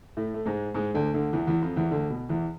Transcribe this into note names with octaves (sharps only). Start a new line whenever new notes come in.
A2 A3
A3
G#2 G#3
G#2 G#3
D2 D3
D2 D3
E2 E3
E2 E3
F2 F3
E2 E3
D2 D3
B2
E2 E3